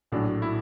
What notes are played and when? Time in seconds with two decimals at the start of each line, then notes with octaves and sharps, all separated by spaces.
0.12 A#1 A2 F#3 D4
0.42 E4